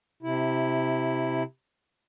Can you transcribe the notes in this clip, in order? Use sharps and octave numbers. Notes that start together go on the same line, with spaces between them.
C3 E4